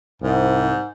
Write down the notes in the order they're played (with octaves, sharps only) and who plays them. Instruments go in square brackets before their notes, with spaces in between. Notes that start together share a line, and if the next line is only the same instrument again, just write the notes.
[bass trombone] C2 [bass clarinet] G#2